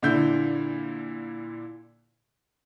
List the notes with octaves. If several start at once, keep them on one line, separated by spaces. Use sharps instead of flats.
A#2 D3 E4 G6